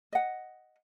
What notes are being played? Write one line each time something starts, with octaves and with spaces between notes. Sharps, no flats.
D#5 F#5